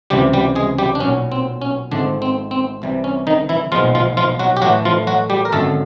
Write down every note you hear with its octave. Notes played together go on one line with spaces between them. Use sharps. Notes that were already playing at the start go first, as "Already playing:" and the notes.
C#2 C3 E3 G3 G4
G3 G4
G#3 G#4
G3 G4
D4
B1 A#2 F#3 C#4
C4
C#4
G#1 G#2 D3 F3 A3 C4 D4
C4
C4
C2 C3 E3 G3
C#4
D#3 D#4
E3 E4
B1 A#2 F3 G#3 B3 F4
F3 F4
F3 F4
F#3 F#4
G4
A2 E3 F#3 A3 F#4
F3 F4
F#3 F#4
G3 G4
A#4
G#1 F#2 D3 A3 A4